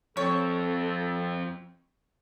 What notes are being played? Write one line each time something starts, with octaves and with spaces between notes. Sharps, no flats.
F2 C4 A4 C#5